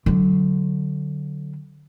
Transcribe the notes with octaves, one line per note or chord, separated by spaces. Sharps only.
D3 F#3